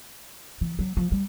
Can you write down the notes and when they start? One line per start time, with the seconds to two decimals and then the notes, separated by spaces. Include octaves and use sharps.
0.61 E3
0.79 F#3
0.97 F3
1.12 G3